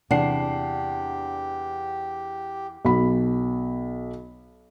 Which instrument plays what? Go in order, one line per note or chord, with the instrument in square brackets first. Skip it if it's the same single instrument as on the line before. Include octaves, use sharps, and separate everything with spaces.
[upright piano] E2 F#5 C7 [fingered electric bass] C3 [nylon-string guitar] D4 [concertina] G4
[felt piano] B1 B5